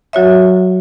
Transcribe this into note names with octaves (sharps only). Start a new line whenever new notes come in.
F#3 F#4 C#5 E5